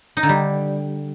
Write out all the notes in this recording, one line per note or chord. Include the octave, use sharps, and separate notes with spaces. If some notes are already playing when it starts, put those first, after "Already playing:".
D#4
D3
G3